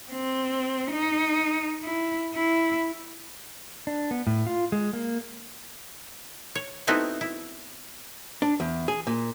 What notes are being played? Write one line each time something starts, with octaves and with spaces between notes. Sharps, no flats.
C4
D#4
E4
E4
D4
B3
A2
F4
G#3
A#3
C#5
A3 B3 C4 D#4 E4 F#4
E4
D4
E2
G#4
A#2